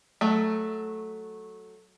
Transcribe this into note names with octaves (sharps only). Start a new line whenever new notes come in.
F#3 A3